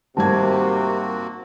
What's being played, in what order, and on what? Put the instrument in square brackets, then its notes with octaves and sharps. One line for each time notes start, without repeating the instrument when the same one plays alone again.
[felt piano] G#1 G3 G#6 [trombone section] C3 [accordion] A#3 C4 F#4 [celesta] A5